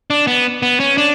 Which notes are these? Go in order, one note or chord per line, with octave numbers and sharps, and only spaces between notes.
D4
B3
B3
C#4
D4